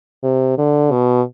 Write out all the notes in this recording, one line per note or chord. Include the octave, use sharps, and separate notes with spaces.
C3
D3
B2